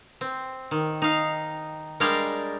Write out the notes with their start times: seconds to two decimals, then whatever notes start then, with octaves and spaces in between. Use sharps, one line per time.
0.21 C4
0.71 D#3
1.02 D#4 F5
2.00 G3 G#3 D4 A#4 F5 G5